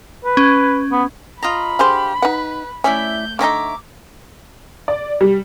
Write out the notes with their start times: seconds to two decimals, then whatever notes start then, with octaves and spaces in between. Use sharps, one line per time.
0.25 B4
0.37 C#4
0.91 B3
1.43 F4 D#5 A#5 B5
1.79 D3 G4 G#4 C5 F5
2.22 D#4 B4 F#5
2.84 A3 C#4 E4 D5 E5 G6
3.39 D3 C#4 D#4 C#5 E5 A#5 D6
4.88 D5
5.21 G3